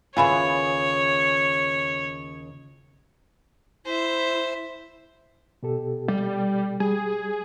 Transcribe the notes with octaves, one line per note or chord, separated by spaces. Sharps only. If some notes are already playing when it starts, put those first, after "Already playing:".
D#2 C#3 E3 E4 F4 G#4 C#5
E4 C5 E5
B2 G4 A4
G3
G3 G#4